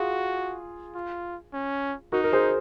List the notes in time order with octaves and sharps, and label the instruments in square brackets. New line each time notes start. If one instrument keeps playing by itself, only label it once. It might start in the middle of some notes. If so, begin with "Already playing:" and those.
Already playing: [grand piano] F4 G#4 [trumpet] F#4
[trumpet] F4
C#4
[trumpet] D#4 [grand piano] F#4 A#4
[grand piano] A#4
G#4 C5